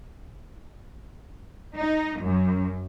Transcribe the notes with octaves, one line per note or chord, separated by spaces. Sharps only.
D#4
F#2